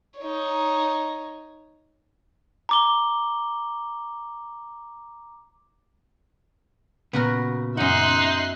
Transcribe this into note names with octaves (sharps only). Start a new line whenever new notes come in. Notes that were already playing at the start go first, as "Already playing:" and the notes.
D#4 C#5
A#5 D6 G7
A#2 C#3 B3 F#4 A#4
F#2 D#4 E5 F#5 C6 F#6